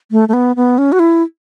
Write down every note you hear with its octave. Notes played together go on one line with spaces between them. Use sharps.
A3
A3
B3
B3
C#4
F#4
E4